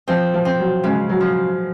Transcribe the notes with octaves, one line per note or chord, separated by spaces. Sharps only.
F3 C4
F3
C4
F#3
C#3 G#3
F#3
F3